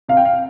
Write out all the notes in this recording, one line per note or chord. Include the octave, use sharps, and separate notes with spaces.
C3 F5
G5
F5